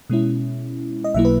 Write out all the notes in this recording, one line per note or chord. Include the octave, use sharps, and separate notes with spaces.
B2 G#3 C#4 E4
D#5
B1 B2 F#3 A#3 E4 E5
B4